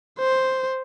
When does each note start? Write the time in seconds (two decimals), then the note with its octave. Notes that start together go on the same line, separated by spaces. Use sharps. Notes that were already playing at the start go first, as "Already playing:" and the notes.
0.19 C5